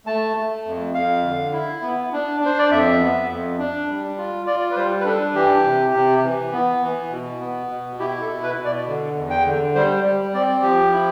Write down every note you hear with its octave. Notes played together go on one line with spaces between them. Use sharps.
A3 A5
A3
F2
F2 F5
D3
E4
B3
D4
D4 C5
D5
F2 E5
B3
F2
D4
G3
F4
F4 D5
B4
G3 C5
B4
D4 A4
E3 G4
C3
C3
E3
B3
E3
B2
B3
B2
E4 G4
A4
B2
B4
B2
D5
D3
E2
G5
D3
G3 C5
G3
C4 D5
F3 G4
E4